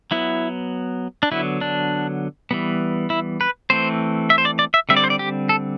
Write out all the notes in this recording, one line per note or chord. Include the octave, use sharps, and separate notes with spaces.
F#3 B3 E4
D4
D3 F#3 B3 E4
D4
E3 G3 B3
E4
B4
E3 A3 C4 C5
E5
C5
D5
D5
E5
D3 G3 C4 E5
D5
C5
D5
G4
A4